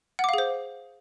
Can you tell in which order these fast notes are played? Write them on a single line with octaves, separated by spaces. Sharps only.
F#5 D6 F5 G#4 C5